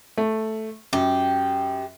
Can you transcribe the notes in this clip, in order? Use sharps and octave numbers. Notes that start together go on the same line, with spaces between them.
A3
F#2 G4